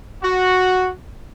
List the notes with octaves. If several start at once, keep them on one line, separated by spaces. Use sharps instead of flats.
F#4